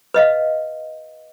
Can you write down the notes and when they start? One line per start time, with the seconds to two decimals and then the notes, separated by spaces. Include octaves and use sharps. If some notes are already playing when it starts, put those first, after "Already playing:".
0.14 B4 D#5 F5